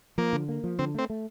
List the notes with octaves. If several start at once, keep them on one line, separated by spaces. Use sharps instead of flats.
F3 A#3
D3
A#3
F3
D3 C4
A3 C4
A3